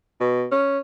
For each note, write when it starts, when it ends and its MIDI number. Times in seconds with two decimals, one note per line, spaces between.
0.21 0.46 47
0.52 0.79 61